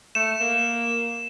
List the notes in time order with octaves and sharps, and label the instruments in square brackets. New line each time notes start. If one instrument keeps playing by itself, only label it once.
[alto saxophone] A3 [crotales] E7
[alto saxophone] A#3